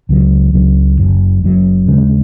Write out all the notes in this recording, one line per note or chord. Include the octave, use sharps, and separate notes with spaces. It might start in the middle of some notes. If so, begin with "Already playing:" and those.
C#2 C#3 F#3
C#2 C#3 F#3
F#1 F#2 F#3
F#1 F#2 F#3
D#2 C#3 G#3